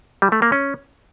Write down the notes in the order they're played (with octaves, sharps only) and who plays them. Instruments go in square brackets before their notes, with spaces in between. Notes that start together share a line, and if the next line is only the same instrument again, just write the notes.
[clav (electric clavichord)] G3
A3
A#3
C#4